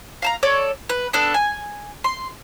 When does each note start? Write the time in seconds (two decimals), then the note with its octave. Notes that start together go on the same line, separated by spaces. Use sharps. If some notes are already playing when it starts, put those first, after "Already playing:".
0.22 F5 A5 A#5
0.43 A4 C#5 D5
0.89 B4
1.13 B3 D4 A4
1.34 G#5
2.04 C6